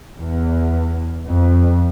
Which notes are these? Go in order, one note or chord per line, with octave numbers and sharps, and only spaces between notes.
E2
F2